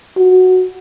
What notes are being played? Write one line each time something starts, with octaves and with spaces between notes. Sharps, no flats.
F#4